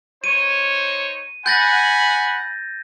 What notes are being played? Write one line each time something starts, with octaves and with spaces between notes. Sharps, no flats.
D#4 C5 C#5 D#7
F#5 G#5 B5 G6 A6 A#6